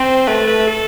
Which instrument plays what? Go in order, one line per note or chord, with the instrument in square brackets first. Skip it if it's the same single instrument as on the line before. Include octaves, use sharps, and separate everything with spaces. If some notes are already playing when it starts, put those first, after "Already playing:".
Already playing: [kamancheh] C4 [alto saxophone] C5
[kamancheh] A3 [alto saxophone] B4
[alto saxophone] B4
A4